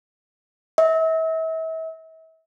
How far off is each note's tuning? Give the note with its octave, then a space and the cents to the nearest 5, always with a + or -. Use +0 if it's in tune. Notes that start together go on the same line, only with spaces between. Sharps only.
E5 -35